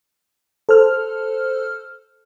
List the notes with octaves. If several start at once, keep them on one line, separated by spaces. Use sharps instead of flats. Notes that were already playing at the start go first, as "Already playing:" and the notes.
A4 C5 F6